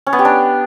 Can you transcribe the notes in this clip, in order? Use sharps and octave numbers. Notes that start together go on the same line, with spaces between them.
C#4
B3
G4
D4